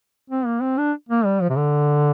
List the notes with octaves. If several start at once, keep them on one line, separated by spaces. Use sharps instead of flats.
C4
A#3
C4
D4
A#3
G3
F3
C3
D3